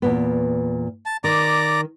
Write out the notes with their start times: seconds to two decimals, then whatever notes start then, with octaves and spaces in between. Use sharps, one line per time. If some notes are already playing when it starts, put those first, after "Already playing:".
0.02 E2 A#2 B3
1.06 A5
1.24 D#3 D5 A#5 D6